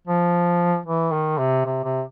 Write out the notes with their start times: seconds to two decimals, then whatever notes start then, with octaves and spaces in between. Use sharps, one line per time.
0.08 F3
0.86 E3
1.13 D#3
1.38 C3
1.66 C3
1.84 C3